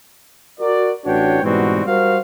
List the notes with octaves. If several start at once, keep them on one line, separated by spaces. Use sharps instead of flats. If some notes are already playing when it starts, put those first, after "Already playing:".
F#4 A#4 D5
A1 D4 F#4 B4 C#5 G5
G#2 B2 E3 G3 C4 F#4
G3 F#4 A#4 C5 F5